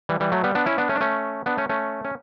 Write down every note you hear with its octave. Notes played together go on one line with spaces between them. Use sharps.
E3 G3
E3 G3
F#3 A3
G3 B3
B3 D4
C#4 E4
B3 D4
A3 C#4
D4
A3 C#4
B3 D4
A3 C#4
A3 C#4
C#4